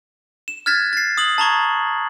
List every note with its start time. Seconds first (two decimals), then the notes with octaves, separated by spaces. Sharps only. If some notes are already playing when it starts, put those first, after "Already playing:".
0.48 E7
0.66 F6 F#6 G#6 A6 B6 E7
0.93 A6 C7
1.18 D#6 F#7
1.38 A5 A#5 C#6 G#6